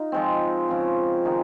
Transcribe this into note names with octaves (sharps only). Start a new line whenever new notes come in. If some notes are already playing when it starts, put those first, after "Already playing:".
Already playing: D#4 F4
F3 G#3 C4
C#3 F3 C4
D#3 G#3 D#4 G#4